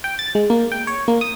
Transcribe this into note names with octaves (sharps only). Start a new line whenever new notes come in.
G5
A6
G#3
A#3
G5
C#5
A#3
D#6